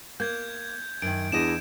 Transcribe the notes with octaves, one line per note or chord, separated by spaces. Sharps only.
A#3 G6 G#6
F#2 D#3 D7
E2 D4 E4 D#5 E7